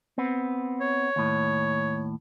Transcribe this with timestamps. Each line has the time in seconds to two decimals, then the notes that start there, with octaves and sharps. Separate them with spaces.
0.18 B3 C4
0.81 C#5
1.16 D#2 A2